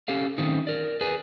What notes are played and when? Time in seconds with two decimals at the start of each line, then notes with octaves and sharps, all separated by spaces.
0.08 C#4 G4 A4 F5
0.38 D#3 A3 C4 C#4 D#4
0.67 A#4 D5
1.01 G#4 B4 G#5